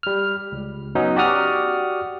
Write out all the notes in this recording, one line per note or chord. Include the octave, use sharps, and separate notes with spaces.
G3 F6
C#2
F#3 B3 C#4 D#4
F#4 G4 D5 F#5 D#6 F6